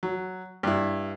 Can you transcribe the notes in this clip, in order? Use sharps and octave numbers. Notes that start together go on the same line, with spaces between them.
F#3
G2 E4